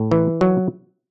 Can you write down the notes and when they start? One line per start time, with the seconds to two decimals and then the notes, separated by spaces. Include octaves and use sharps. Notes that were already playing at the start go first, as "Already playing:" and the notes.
Already playing: A2
0.11 E3
0.41 F#3